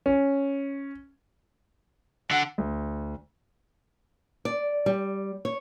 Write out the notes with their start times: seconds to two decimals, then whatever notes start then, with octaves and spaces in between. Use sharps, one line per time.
0.06 C#4
2.31 D3 D4 F#5
2.58 D2
4.45 D5
4.86 G3
5.45 C#5